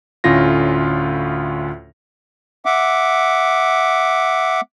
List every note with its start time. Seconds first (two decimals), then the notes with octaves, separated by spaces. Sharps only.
0.24 D2 A2 C#4 F4 A#6
2.65 E5 F#5 D6